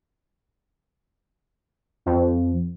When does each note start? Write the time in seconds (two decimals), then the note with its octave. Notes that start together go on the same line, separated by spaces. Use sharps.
2.06 F2